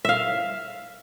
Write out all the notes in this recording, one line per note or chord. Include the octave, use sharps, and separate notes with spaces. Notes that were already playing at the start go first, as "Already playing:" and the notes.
E5 F5